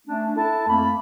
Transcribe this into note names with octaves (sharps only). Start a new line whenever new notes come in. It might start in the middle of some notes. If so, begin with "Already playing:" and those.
A3 C#4 D4
E4 A4 A5
F2 A3 A#3 B5